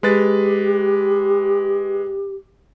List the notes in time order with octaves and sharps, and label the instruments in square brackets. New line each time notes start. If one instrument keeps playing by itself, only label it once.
[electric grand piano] G#3 B4 A6 [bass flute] G4